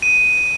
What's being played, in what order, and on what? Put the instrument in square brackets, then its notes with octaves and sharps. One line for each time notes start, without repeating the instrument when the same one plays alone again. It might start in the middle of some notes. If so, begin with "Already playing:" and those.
[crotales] D#7